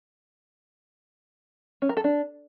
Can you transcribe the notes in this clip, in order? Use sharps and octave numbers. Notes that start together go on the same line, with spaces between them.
C#4
A#4
A4
D4